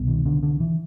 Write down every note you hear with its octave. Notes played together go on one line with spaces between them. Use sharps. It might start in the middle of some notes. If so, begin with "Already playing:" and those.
Already playing: C2 B2
D#3
D3
D3
E3